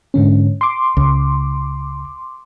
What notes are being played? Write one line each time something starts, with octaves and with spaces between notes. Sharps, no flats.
G#2 D3 C#4
C6 D6
C#2